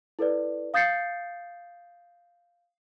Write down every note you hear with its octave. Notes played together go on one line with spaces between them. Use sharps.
E4 A4 B4 D5
F5 D#6 G6 A6 C7 C#7